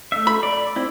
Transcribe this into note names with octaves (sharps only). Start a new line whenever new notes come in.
A3 E5
B5
D5
C4 E4